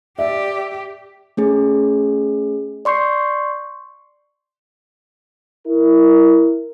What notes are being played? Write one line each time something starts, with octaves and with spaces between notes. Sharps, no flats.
G4 D5 E5
A3 C#4 G#4
D5 C6 C#6 G6 C7
E4 A#4